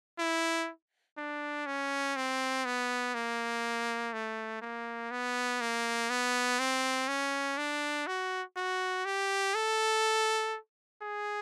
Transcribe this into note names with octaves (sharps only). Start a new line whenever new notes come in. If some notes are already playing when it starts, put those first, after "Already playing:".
E4
D4
C#4
C4
B3
A#3
A3
A#3
B3
A#3
B3
C4
C#4
D4
F#4
F#4
G4
A4
G#4